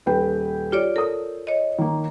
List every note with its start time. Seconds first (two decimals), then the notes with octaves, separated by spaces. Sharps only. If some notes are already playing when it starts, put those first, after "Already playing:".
0.06 D#1 B4 G5
0.72 F4 G4 C#5 D5
0.96 A4 A#4 D#6
1.47 C#5 D#5
1.78 D#3 A#3